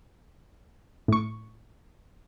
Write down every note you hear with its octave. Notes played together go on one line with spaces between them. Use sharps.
A2 C#6